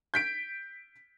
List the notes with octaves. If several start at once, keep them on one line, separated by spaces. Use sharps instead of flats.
G6 B6 D7